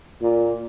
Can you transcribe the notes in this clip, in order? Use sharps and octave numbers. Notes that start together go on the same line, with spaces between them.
A#2